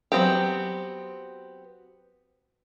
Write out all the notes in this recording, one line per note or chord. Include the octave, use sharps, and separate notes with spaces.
F#3 B3 C4 G4